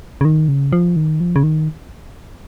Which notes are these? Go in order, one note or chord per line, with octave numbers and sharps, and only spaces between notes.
C#3
D#3
C#3
F3
D#3
F3
C#3
D#3